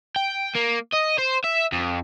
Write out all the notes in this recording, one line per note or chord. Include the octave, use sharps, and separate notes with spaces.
G5
A#3
D#5
C5
E5
F2